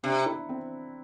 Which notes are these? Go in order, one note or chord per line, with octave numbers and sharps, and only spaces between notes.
C3 D4
E4
C4